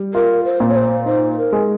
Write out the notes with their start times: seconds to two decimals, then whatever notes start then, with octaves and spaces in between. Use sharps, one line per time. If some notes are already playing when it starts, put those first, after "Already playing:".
Already playing: G3
0.14 F4 A#4
0.45 C5
0.60 A#2
0.70 C#5
0.76 C5
1.06 D#4 C5
1.37 A#4
1.52 G#3